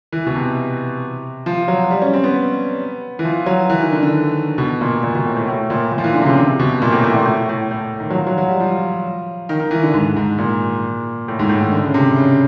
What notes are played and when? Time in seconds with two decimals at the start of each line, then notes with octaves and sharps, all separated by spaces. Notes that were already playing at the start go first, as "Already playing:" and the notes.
0.12 E3
0.26 B2
0.35 C3
1.46 F3
1.68 F#3
1.91 G3
2.02 C#4
2.13 C4
2.24 B3
3.19 E3
3.25 F3
3.46 F#3
3.70 E3
3.81 D#3
3.92 D3
4.03 D3
4.58 B2
4.81 A#2
5.03 A#2
5.15 B2
5.25 A2
5.36 A2
5.48 A2
5.70 A#2
5.92 A#2
5.98 F3
6.04 E3
6.14 D3
6.22 C3
6.26 C#3
6.37 C3
6.59 B2
6.82 A#2
6.92 A2
7.04 A2
7.15 A#2
7.26 A2
7.49 A2
7.71 A2
8.00 D#3
8.10 F#3
8.15 F3
8.27 F#3
8.38 F#3
8.48 G3
8.60 F3
9.49 D#3
9.60 D#3
9.71 E3
9.83 D3
9.94 G#2
10.16 G#2
10.38 A#2
11.28 A2
11.39 G#2
11.49 A2
11.61 D#3
11.72 D3
11.84 C#3
11.94 C3
12.16 C#3